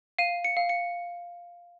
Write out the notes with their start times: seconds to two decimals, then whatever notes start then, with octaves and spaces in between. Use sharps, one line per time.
0.19 F5 D#7
0.44 C#7
0.57 F5
0.69 C#7